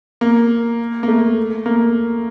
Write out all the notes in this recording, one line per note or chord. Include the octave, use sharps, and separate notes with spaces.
A#3
A#3
A3
A#3